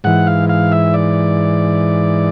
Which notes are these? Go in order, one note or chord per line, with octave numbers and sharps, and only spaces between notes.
G#2 E3 F#5
F5
F5
E5
D5